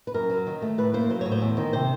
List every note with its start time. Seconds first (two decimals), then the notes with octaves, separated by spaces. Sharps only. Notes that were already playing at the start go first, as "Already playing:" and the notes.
0.07 B4
0.14 F#2 A#4
0.30 F#3
0.47 D#3
0.62 A3
0.78 A2 B4
0.93 A#3 C5
1.10 F#3 C5
1.21 A2 C#5
1.32 C5
1.42 E2
1.57 D#3
1.73 C3 C5